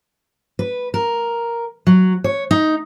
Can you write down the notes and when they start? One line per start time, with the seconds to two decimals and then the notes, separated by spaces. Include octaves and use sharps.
0.59 B4
0.94 A#4
1.87 F#3
2.24 C#5
2.51 D#4